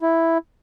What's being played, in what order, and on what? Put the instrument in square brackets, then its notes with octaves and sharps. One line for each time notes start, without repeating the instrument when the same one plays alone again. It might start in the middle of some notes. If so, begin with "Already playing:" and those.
[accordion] E4